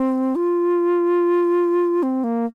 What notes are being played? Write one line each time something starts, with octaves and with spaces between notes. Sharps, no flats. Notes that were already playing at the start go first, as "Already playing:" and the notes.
Already playing: C4
F4
C4
A#3